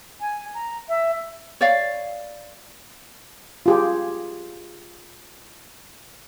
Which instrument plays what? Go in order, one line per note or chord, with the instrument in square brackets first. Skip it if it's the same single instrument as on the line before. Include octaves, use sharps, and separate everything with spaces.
[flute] G#5
A#5
E5
[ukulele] C#5 D5 F5
[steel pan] F4 G4 G#4